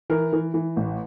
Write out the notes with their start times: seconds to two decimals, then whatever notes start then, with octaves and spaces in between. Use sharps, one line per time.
0.10 E3 A#4
0.33 E3
0.54 E3
0.76 A1